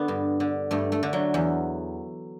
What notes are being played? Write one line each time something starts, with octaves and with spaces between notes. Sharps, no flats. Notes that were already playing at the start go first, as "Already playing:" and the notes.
Already playing: D3 B3 D4
G2
D3
G2 A3
A3
D3
F#3
E2